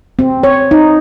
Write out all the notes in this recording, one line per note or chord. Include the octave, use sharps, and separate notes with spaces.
C4
C#5
D#4